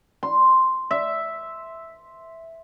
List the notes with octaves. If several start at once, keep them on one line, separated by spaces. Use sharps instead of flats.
C6
E5